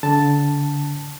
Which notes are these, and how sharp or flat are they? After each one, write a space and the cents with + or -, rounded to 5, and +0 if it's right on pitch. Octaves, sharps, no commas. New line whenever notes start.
D3 -30 A5 +0